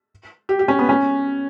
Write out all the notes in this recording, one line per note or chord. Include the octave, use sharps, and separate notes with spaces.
G4
G4
C#4
B3
C#4